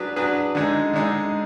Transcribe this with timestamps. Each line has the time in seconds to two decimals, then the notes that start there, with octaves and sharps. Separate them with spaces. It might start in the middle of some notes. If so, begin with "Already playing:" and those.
Already playing: F#3 D4 G#4 B4
0.16 F#3 D4 G#4 B4
0.55 D3 G#3 D#4
0.93 D3 G#3 D#4